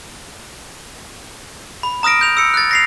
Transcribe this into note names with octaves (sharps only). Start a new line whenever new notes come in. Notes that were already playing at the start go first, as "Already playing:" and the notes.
B5
A#5 D#6 F6 A#6 D7
G6 F7
E6 C#7
F#6 A6
A#6 C7 F7